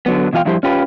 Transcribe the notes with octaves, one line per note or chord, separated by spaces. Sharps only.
D3 F#3 B3
B2 E3 F4 F5 G5
G2 F3 E4 G4 C5
C#4 F4 G4 B4